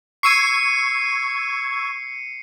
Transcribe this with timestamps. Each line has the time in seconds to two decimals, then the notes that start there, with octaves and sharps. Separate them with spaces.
0.23 C#6 E6 G#6 C7 C#7 D#7